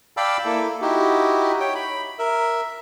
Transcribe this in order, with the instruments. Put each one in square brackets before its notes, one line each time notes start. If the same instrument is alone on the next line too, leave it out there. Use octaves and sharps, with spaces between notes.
[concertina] D5 F5 G5 A5 B5 E6
A#3 E4 A4
D#4 E4 F#4 G4
C#5 G5
B5
A#4 E5